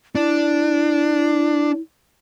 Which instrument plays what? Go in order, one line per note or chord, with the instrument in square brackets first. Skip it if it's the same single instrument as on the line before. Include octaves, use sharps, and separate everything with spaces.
[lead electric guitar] D4 [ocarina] E4